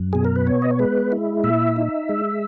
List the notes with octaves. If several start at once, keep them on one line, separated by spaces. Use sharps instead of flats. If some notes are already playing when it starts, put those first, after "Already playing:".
Already playing: F#2
B2 G#4
A#4
B4
B3 C#5
D#5
C#5
G#3 B4
E4
A#2 E5
D#4
G#3